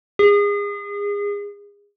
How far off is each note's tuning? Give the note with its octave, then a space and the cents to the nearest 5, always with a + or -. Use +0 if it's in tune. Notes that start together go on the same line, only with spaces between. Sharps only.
G#4 -30